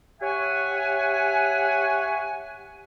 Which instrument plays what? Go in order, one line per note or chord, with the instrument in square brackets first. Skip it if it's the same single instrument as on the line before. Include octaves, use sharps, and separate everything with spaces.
[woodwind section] G4 C#5 E5 F#5 G#5